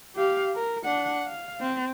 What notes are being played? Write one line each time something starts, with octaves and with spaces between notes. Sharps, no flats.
G4 F5
A#4
D4 F#5
F5
C4